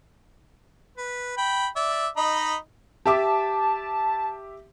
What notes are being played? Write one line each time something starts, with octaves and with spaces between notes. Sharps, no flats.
B4
G5 B5
D5 E5
D#4 D#5 B5
G4 E5 A5 D6